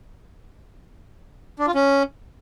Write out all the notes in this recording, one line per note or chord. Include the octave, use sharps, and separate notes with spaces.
D4
F4
C#4